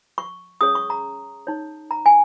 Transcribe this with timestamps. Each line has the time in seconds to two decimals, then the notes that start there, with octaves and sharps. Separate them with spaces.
0.18 C#6
0.61 C#4 G#4 C#5 D#6
0.75 C#6
0.90 A#5
1.47 D#4 C#5
1.91 A#5
2.06 G#5